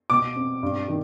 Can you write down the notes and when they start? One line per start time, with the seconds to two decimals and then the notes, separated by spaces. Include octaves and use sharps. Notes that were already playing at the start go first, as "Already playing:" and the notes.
0.10 B2 D6
0.36 C4
0.63 G2
0.88 D#3